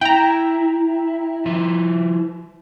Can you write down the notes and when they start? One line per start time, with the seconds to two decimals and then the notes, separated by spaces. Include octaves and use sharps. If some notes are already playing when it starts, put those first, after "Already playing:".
0.01 E4 G5 A#5
1.46 F3 E4